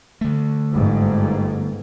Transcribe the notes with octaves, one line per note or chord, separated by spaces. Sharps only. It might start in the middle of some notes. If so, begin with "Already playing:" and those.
D3 A3
G1 G#2